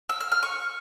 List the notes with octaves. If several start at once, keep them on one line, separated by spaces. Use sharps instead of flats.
E6
F6
F6
C#6